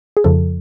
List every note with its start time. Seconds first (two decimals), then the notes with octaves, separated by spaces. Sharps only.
0.17 G#4
0.24 F2 C#3 F3 A4